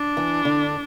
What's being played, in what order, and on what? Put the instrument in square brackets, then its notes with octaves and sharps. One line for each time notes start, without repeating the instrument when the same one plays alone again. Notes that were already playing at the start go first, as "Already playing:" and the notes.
Already playing: [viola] D4
[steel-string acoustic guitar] E3
D3